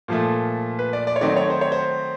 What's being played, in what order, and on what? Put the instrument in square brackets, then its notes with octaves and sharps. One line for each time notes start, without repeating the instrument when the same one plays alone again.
[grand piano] A#2 F3 A3
B4
D5
D5
C#5
D#3 F#3 A3 C4 D#4 D5
C#5
C5
C#5
C5